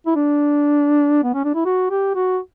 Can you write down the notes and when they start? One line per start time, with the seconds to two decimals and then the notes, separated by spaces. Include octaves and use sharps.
0.06 E4
0.16 D4
1.24 B3
1.34 C#4
1.45 D4
1.55 E4
1.65 F#4
1.91 G4
2.15 F#4